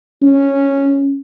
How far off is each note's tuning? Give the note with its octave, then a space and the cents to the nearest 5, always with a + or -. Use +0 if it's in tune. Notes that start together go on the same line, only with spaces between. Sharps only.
C#4 -5